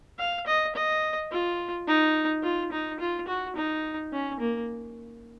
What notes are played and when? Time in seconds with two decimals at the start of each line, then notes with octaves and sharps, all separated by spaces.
0.19 F5
0.46 D#5
0.75 D#5
1.32 F4
1.88 D#4
2.43 F4
2.72 D#4
3.00 F4
3.28 F#4
3.56 D#4
4.12 C#4
4.40 A#3